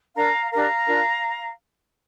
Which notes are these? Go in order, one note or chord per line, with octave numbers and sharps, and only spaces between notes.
D4 A#4 F5 A#5
D4 G4 A#4 F5 A#5
D4 F4 A#4